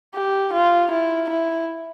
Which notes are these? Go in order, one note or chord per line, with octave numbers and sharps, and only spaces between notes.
G4
F4
E4
E4